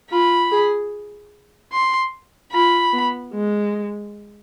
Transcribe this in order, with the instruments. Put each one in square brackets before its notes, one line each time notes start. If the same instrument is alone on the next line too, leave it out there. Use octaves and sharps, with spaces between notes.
[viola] F4 [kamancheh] B5
[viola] G#4
[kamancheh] C6
[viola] F4 [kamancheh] B5
[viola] B3
G#3